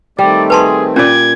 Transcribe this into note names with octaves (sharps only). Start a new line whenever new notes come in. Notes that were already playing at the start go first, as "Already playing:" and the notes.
D#3 G3 A3 C4 D5
G#4 B4 A5 C6
A#2 C#4 B4 D5 G#6